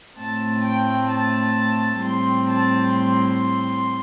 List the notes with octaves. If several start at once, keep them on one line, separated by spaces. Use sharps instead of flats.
A2 A3 C4 A5
G5
A5
A2 G3 C4 C6
A5
C6